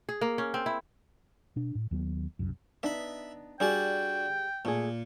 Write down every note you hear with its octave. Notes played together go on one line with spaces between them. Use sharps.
G#4
A#3
C#4
C4
E4
B2 D4
A2
D#2 F#3 B3
E1 C2 F#2
B3 D4 D#4 E5 B5
G3 D4 F#4 G#4 G5 A5
A#2 A3 G#4